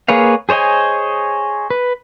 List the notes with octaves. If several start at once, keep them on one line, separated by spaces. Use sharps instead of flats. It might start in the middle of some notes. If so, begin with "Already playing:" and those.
A#3 G#4 B4 C#5 F5
G#4 C5 C#5 D#5 G#5
B4